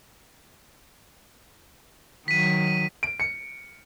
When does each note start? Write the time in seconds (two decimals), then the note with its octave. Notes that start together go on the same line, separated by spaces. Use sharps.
2.28 D#3 F#3 B6 D#7
3.03 D7
3.20 C#7